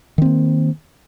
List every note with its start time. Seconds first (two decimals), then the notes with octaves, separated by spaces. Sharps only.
0.18 D#3
0.22 C4
0.25 A#3